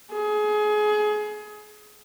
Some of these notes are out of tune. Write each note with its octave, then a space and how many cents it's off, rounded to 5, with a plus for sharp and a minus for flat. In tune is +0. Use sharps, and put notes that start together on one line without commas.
G#4 +25